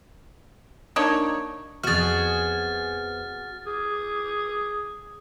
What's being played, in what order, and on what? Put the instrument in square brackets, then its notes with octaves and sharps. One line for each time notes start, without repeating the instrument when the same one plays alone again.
[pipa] A#3 D4 D#4 C#5
[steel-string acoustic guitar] F2 B3 [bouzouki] F#4 G#4 [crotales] F6 A6
[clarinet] G#4